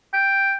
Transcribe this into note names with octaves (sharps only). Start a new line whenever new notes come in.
G5